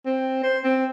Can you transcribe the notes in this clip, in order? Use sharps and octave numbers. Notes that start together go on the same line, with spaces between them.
C4
C5
C4